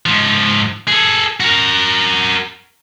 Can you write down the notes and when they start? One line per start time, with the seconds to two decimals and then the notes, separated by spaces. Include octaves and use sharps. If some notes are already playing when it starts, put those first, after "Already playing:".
0.06 G#2 F3
0.88 G#4 A4
1.40 F#4 A#4